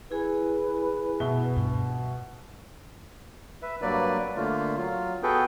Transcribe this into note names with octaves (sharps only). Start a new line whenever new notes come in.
E4 G#4 B4 G#5
B2 E5 G7
G2 D4
B4 E5
G2 F#3 A#3 B4 D5
D3 A3 A#3 F4
F#3 F4
B3 F#4 G#4 A4 B4 G5